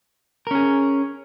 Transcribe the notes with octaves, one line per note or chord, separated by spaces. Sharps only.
C#4 G#4 A#4